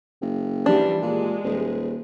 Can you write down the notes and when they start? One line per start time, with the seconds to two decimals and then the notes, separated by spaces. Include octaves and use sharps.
0.22 F#1
0.66 E3 F3 G3 D4
1.02 A#2 G#3
1.44 D#1